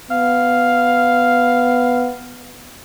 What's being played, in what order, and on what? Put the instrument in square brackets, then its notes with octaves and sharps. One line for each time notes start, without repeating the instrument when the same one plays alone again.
[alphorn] B3 [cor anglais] F5